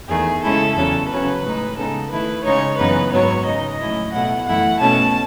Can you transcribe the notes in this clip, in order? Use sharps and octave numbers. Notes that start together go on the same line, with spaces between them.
E2 D#3 A3 G#4
C#3 G#3 C#4 E4 A4
E2 C#3 F#3 C#4 A4
C#3 F#3 C#4 B4
A2 G#3 D#4
C#3 G#3 B3 D#4 A4
D#3 A3 E4 B4
C#3 G#3 D#4 C#5
F#2 C#3 E3 B3 D#4 B4
G#2 F#3 B3 C#5
C#3 G#3 D#4 D#5
A2 F#3 C#4 E4
B2 A3 E4 F#5
F#2 E3 A3 E4 F#5
B2 A3 C#4 A5